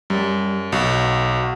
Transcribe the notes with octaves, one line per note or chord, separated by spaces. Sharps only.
F#2 G3
B1 F#4